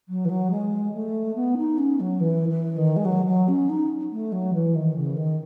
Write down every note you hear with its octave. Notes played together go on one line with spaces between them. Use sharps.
F#3
E3
F#3
G#3
A3
B3
D#4
C#4
F#3
E3
E3
D#3
G#3
F#3
F#3
C#4
D#4
A3
F#3
E3
D#3
C#3
D#3